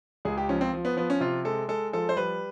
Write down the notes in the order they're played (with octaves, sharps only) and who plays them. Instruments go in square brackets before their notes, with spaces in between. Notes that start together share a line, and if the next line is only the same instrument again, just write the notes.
[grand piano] C#2 G#4
G4
F3 C#4
C4
F3
B3
F3 B3
C#4
C3 F4
G#3 A4
G#3 A4
F3 A4
C5
G3 B4